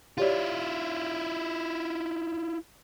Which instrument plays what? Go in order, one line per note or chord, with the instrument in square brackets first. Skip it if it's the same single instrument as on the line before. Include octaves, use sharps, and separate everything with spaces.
[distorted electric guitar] E4 F4 [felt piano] G4 C#5 D5